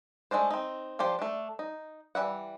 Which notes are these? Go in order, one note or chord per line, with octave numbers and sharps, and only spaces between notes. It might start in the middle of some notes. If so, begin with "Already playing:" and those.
G#3 A3 D4 C5
C4 D#4
F3 D4 G4 C5
A3 D4
D#4
E3 G3 E5 F#5